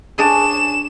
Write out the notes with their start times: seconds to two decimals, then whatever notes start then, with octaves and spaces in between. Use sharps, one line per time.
0.19 C#4 D4 G#4 E7